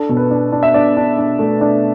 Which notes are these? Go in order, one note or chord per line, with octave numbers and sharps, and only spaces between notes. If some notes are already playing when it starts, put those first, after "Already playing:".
Already playing: D4 A4
B2
B4
D4
D4
E5
D4 D5
D4
D4
A3
D4